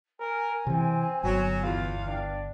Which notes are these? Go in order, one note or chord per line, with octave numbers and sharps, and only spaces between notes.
A#4 G#5
C3 E3 C4
G1 F#3
E2 F4 F5
D4 G5